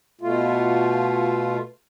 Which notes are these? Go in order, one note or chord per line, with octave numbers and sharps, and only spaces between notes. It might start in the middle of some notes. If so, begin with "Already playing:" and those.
B2 A3 F4